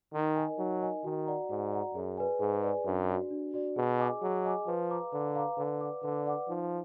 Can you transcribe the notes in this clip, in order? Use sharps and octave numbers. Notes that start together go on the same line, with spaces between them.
D#3 D#4
A#4 D#5 G#5
F#3 D#4
A#4 D#5 G#5
D#3 F#4
D5 F#5 A#5
G#2 F#4
D5 F#5 A#5
F#2 G#4
B4 D5 G#5
G#2 G#4
B4 D5 G#5
F#2 D4
F#4 D5
D4
F#4 D5
B2 G#4
D#5 G#5 D6
F#3 G#4
D#5 G#5 D6
F3 B4
F5 A#5 D6
D3 B4
F5 A#5 D6
D3 B4
D5 F#5 D6
D3 B4
D5 F#5 D6
F3 D#4